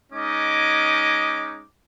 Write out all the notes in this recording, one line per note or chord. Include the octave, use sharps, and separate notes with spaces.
G#3 C#4 D#4 D#5 D6